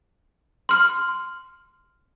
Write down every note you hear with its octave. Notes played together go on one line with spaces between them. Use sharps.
C6 F6